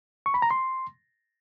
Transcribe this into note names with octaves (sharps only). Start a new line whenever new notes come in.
C#6
B5
A#5
C6